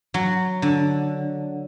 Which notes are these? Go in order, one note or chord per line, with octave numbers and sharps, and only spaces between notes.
F#3
D3